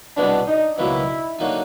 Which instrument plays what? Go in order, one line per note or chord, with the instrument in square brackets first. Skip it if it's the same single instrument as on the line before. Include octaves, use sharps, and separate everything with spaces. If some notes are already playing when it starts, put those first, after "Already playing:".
[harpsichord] C2 B2 G#3 B3 [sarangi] D4
[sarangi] D#4
[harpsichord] C#2 B2 F#3 A#3 [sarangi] E4
[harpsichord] D3 F#3 A#3 D#4